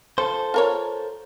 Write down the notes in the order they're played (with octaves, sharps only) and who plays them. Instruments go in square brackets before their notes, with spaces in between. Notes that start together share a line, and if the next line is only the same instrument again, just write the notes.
[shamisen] F3 [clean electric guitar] A4 C5
[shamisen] F4 A#4 C#5